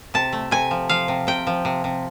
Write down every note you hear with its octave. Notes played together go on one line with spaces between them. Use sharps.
C3 A5
A3
C3 G#5
F3
F3 F5
C3
C3 G5
F3
C3
C3